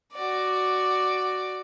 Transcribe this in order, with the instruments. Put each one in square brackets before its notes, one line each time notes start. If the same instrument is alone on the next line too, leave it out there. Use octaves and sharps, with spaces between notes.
[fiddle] F#4 D5